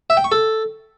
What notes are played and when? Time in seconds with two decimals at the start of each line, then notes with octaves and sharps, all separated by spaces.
0.10 E5
0.17 G5
0.24 C#6
0.32 A4